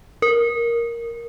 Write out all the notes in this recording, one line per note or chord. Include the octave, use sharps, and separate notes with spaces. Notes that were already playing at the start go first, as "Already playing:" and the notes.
A#4